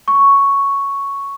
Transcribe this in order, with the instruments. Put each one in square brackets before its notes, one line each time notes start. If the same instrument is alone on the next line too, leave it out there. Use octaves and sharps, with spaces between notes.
[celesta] C#6